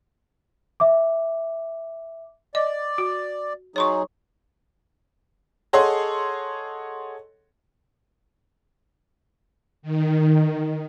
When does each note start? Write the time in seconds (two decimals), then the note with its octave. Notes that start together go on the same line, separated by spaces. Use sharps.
0.80 E5 D6
2.55 D5 D#5
2.98 F#4
3.76 F#3 D#4 G#4 C#5 C6 C#6
5.73 G#4 A4 C#5 D#5 F#5 C6
9.82 D#3